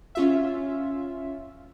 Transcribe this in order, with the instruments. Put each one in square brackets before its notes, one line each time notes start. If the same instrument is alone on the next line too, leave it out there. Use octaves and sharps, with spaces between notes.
[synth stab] C#4 F4 E5